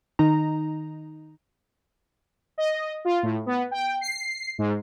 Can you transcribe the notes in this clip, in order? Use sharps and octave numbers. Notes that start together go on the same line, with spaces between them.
D#3 D#4 A#5
D#5
F4
A2
B3
G5
C7
G#2